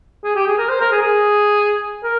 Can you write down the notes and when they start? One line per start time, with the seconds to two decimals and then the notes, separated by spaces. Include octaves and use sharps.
0.24 G#4
0.35 G4
0.47 G#4
0.58 A#4
0.69 C5
0.80 A#4
0.92 G#4
1.03 G#4
2.03 A#4